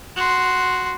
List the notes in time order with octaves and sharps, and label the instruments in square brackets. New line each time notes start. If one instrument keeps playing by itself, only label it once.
[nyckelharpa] F#4 C6